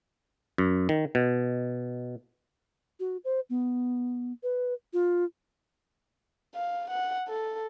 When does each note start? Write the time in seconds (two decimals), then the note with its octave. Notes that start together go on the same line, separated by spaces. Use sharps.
0.58 F#2
0.89 D#3
1.15 B2
3.00 F#4
3.25 C5
3.50 B3
4.43 B4
4.93 F4
6.55 F5
6.90 F#5
7.28 A4